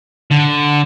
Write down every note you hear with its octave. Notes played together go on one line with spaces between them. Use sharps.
D3